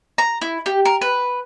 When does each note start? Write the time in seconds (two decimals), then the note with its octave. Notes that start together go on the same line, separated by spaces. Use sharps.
0.18 A#5
0.42 E4
0.66 G4
0.85 A#4
1.01 B4